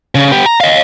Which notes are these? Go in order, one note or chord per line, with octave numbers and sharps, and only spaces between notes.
C#3
B3 G4
A#5
D#5 F5